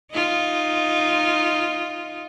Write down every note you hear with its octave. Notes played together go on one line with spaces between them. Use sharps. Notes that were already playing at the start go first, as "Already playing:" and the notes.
D#4 F4